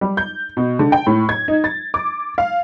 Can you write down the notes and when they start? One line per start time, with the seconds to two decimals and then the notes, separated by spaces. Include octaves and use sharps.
0.01 G3
0.17 G6
0.57 B2
0.79 D3
0.92 G5
1.07 A2
1.29 G#6
1.48 D#4
1.64 A6
1.94 D6
2.38 F5